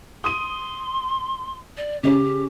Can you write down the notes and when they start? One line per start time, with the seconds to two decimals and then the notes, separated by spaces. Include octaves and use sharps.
0.24 C6 D#6 D#7
1.77 D5
2.03 C#3 C#4 G4